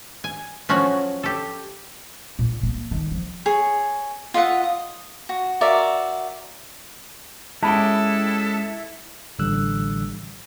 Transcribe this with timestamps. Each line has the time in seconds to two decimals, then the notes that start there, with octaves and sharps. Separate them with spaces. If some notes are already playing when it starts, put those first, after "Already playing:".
0.24 G#5
0.69 F3 F#3 C#4 F#4 C#5
1.23 G4 A4
2.39 A#2
2.63 A#3
2.91 D#3
3.12 F3
3.46 G#4 C#5
4.34 F4 D#5 E5 F#5
4.64 D#6
5.29 F#4
5.61 F#4 A#4 D5 E5
7.63 G#3 C#4 E4 G4 A4 A5 B5
9.39 A1 D3 G3 E6 F#6